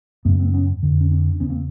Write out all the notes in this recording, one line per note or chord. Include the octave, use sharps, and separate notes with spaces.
F#2 C#3 A3 B3
A#3 C4
B3 C#4
F2 D3
C#4
C4 D4
E2 C#3 B3 C#4
A#3 C4